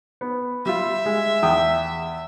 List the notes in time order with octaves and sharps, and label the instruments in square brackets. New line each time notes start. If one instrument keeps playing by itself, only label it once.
[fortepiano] B3
[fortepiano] G3 F4 [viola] E5
[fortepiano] G#3
E2 G5 D#6